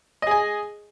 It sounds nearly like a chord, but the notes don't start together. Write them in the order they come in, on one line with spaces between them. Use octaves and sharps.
D#5 G#4 G#5